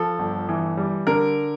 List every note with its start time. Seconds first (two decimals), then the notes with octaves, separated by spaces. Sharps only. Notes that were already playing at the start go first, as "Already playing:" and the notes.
Already playing: F3 A4
0.19 G1
0.49 E3
0.77 G3
1.07 D3 A#4